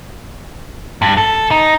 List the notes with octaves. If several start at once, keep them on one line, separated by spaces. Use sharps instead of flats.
G2
A4
D#4